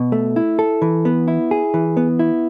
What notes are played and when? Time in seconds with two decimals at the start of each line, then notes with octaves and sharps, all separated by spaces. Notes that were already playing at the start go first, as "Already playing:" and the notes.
Already playing: B2
0.12 A3
0.36 E4
0.59 A4
0.82 E3
1.05 B3
1.28 E4
1.51 G#4
1.74 E3
1.97 B3
2.19 E4